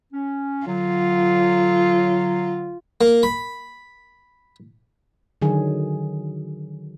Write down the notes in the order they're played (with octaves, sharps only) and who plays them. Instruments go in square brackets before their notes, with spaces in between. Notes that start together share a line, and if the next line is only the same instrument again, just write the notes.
[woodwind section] C#4
[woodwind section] D3 F#3 [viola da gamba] F4
[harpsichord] A#3
B5
[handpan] D3 D#3 F#3 G#4